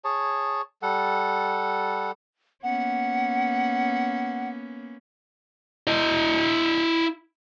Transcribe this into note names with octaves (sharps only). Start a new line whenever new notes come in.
G#4 C#5 A5
G3 A4 F#5
A#3 B3 C#4 F#5
E4 D#5